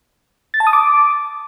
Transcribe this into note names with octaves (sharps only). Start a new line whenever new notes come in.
A6
A5
D#6
D6